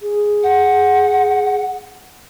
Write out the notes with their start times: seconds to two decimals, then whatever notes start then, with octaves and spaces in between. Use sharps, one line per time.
0.02 G#4
0.43 F#5